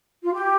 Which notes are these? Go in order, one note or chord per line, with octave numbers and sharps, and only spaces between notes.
F4
G4